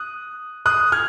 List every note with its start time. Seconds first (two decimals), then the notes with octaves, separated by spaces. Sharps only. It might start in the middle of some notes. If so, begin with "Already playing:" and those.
Already playing: D#6 F#6
0.66 D#6 F#6
0.92 F6 G#6